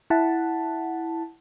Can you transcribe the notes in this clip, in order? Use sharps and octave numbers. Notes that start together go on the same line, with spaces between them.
E4 F#5 A5